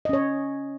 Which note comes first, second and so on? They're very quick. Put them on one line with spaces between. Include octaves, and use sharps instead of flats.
D#5 C#4 C#5